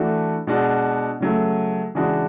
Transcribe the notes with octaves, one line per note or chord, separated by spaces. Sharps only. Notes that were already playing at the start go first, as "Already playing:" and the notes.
Already playing: E3 A3 D4 F#4
B2 G#3 D4 F#4
C#3 F#3 A3
C#3 E3 G#3 D4 F#4